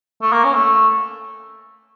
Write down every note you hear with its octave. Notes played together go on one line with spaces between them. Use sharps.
A3
A#3
C#4
A3